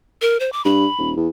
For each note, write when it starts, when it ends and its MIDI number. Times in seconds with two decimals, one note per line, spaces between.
0.22 0.37 70
0.40 0.52 72
0.53 0.63 86
0.65 0.86 43
0.65 1.10 83
0.98 1.14 27
1.16 1.28 40